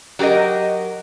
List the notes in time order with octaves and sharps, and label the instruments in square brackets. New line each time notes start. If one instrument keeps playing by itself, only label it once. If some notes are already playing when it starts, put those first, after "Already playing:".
[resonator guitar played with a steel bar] F#3 G4 A4 A#4 D#5